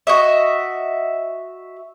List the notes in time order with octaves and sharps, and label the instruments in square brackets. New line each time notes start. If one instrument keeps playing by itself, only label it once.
[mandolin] F#4 D#5 E5